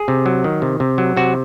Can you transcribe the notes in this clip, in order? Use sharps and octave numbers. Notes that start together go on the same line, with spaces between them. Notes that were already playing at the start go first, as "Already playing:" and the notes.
Already playing: G#4
C3
F#3
D#3
C3
C3
F#3
C3 F#4